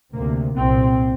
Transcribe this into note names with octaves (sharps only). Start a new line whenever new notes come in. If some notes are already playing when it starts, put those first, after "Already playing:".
D2 C3 A#3
C2 A#2 C4